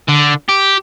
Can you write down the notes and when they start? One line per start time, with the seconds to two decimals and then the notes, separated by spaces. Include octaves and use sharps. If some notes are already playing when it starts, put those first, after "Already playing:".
0.08 D3
0.49 G4